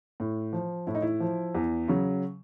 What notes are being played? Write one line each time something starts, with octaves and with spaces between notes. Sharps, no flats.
A2
F3
A2 E4
D#4
E4
F3
E2
C#3 F#3